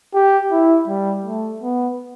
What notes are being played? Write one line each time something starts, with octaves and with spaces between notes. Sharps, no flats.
G4
E4
G3
A3
B3